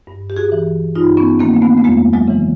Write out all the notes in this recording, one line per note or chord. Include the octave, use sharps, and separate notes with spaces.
G2
G4
F#4 G#4
E3
G2 D#4 F4
B3 C#4
D#3 A#3 C4
A#3
A3 B3
A3
F2 G#3 A#3
F#3 G#3
C#3 E3